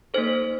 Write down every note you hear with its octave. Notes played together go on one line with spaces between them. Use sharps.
A#3 D#4 A4 C5